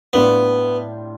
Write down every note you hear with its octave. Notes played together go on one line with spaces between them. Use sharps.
A2 G3 B3 D4 F4